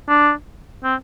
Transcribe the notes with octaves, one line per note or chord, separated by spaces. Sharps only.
D4
C4